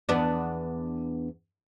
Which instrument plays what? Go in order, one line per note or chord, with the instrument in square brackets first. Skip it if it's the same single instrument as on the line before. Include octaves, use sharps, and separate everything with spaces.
[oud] E2 B3 D4